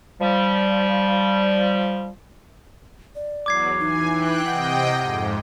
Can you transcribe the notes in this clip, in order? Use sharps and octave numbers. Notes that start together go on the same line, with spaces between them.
F3 G3
D5
E2 F#3 D6 G#6 C7
E3 D#4 G#5
E3 G5 F#6
C3 D#5 F#5 G5
F2 G#2